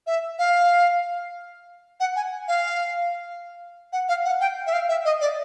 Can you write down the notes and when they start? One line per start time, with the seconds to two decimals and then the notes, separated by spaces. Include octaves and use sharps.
0.07 E5
0.39 F5
2.00 F#5
2.16 G#5
2.48 F5
3.93 F#5
4.09 F5
4.25 F#5
4.41 G5
4.67 E5
4.73 F5
4.89 E5
5.05 D#5
5.21 D5